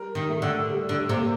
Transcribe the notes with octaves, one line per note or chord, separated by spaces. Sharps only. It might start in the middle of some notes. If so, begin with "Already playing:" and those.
Already playing: G3 A#4
D#3
A3
D3
G3
D3
C3 A#3